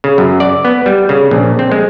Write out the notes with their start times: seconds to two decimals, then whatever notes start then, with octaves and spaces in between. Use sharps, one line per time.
0.04 C#3
0.18 F#2
0.40 D5
0.65 B3
0.86 G3
1.09 C#3
1.31 A#1
1.59 C4
1.72 G#3